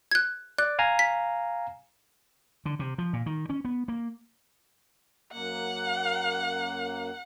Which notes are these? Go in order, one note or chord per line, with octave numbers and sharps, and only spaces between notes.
F#6 G#6
D5 F#6
F5 G#5 A#5
B6
D3
C3
F3
A#2
D#3
C#4
B3
A#3
F#2 A#3 F#5